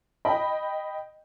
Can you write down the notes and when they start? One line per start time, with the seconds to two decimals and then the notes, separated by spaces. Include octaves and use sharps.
0.25 D#5 G5 B5